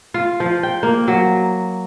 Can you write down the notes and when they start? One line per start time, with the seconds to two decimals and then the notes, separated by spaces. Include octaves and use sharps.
0.14 F4
0.40 F3
0.63 G5
0.83 A#3
1.08 F#3